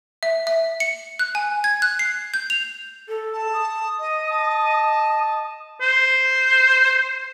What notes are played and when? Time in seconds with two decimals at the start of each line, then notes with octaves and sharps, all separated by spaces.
0.23 E5
0.47 E5
0.80 C#7
1.19 F#6
1.35 G#5
1.64 G#6
1.82 F#6
1.99 C7
2.34 G6
2.50 F7
3.08 A4
3.33 A5
3.53 D#6
3.99 D#5
4.31 A5
5.81 C5